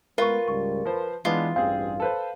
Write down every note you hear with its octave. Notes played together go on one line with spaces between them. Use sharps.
G#3 A3 B3 F4 A#4 B4 C#6
C#2 G#2 G3 C#6
F3 B4 C5
E3 G#3 B3 D4 F4
A1 E2 G2 C4 G#4 F5
A4 B4 C5